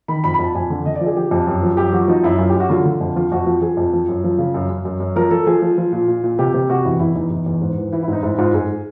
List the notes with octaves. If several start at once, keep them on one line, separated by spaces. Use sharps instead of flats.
D#3 B5
F2 B5
B5
F2 A5
F2 G#5
D3
D3 D#5
F3 D5
G#4
F3 G4
F2
F#2
F3
F#2 G4
F3 F#4
F3 D#4
F#2 E4
F#2 F4
G4
F#2
F#4
D3 F4
D3
F2
F3 F4
F2 F#4
F3
F3 G#4
F2
F3
F#2
F3
C#3
F#2
F#2
F#2
F#2
F3 A#4
F3 A4
F3 G#4
F3
F3
A#2
A#2
A#2
C3 G4
C3
C3 F#4
E2 E4
E2 E4
E2 D#4
E2
E2
G#2
E3
E3 E4
E4
G#2 D#4
G#2 E4
G#2 F4
G#2 G#4